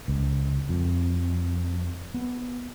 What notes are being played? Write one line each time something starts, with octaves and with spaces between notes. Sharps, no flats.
C#2
F2
B3